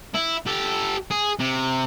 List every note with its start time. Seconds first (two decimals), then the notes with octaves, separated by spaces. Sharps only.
0.14 E4
0.47 G4 A4
1.11 G#4
1.39 C3